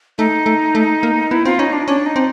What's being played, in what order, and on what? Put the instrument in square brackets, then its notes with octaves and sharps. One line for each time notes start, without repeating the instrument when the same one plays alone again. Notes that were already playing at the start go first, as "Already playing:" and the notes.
[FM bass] A3 [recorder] D#4
[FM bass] A3
A3
A#3
[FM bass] B3 [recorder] E4
[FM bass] C4 [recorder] F4
[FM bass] C#4 [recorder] D#4
[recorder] D4
[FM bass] C#4 [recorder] D4
[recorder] D#4
[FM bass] C4